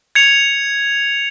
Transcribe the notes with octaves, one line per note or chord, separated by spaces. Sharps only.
G#6 C#7 F7